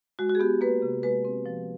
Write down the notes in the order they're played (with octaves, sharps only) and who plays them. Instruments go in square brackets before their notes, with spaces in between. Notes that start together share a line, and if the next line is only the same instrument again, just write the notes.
[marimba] G#3 F#4
F#4
G#4
B3 G4
A#3 B4
C3
G#3 B4
C4
F3